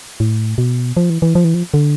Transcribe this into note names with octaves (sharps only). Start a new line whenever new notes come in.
A2
B2
F3
E3
E3
F3
E3
F3
D3